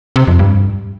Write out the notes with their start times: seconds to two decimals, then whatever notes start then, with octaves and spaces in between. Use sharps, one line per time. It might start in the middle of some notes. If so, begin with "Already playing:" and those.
0.16 C3
0.27 F2
0.39 G2